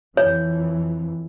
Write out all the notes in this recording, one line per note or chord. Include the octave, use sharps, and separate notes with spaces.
F2 E3 C#5